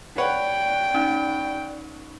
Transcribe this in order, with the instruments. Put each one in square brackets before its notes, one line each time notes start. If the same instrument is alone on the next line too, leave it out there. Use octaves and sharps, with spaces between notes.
[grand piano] B4 C#5 F#5 [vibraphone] D5 [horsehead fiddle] G5
[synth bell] C#4 D#4